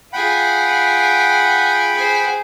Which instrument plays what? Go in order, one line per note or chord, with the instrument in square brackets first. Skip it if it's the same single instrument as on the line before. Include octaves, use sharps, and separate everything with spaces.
[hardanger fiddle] F4 G#4 [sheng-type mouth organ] F#5 G5 B5
[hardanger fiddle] G#4 C5